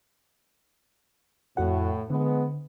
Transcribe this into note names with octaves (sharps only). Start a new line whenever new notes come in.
F2 A2 F#4 F#5
D3 F3 G#3 B3